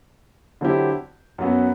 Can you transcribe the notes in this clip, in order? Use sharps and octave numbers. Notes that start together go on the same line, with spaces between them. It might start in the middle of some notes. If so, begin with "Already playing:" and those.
D3 F#3 C4 E4 G4
F#2 F#3 B3